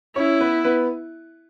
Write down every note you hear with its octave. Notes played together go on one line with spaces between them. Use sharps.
C#4 E4 C#5
B3 B4
B3 B4